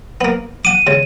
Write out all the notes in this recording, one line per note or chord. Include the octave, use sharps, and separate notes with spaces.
A#3 B3
F#5 D6 D#7
C#3 G#3